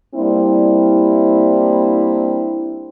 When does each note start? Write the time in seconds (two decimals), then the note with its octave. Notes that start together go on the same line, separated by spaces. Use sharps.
0.15 G3 A#3 C4 D4 E4